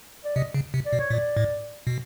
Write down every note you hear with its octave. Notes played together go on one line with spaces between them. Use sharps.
D5
C3 D#5
C#3
C3
D5
B2
C#5
A#2
D5
A2
B2